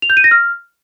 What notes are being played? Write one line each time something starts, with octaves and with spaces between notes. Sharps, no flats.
F7
G6
D#7
A#6
F6